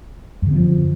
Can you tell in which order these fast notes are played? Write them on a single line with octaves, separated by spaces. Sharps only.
F#2 D3 C4 F3